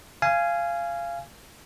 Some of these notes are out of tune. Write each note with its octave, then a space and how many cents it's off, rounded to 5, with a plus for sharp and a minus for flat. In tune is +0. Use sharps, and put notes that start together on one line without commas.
F5 -20 G#5 +0